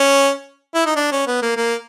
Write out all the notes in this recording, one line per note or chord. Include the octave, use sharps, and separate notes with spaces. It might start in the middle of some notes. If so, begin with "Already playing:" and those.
Already playing: C#4
E4
D#4
D4
C#4
B3
A#3
A#3